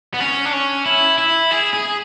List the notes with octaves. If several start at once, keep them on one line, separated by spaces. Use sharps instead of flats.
B3
C#4
D4
C#4
E4
E4
G#4
G#4